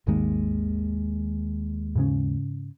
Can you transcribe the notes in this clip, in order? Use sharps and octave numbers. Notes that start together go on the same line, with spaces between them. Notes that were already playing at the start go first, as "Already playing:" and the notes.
G#1 D#2 D#3 G#3 A#3
G#2 C#3 C#4